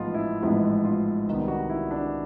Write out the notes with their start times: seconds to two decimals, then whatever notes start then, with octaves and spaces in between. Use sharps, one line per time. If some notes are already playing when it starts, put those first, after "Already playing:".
Already playing: A1 G#2 F3 G#3 B3 F4
0.14 E4
0.42 A1 G#2 F3 G#3 B3 E4
0.84 F4
1.28 C2 C3 D#3 G3 B3
1.48 F#4
1.70 E4
1.91 D4